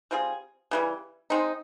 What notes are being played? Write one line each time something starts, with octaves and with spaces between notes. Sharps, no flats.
G3 C4 F4 G#4
C#3 E3 G3
G#3 C4 D#4